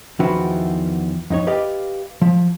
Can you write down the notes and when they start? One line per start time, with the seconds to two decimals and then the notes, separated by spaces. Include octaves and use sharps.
0.20 E2 D#3 F3 E4 F#4 B4
1.30 F2 D#4 C#5
1.47 G4 B4 D5 D#5 F5
2.22 F3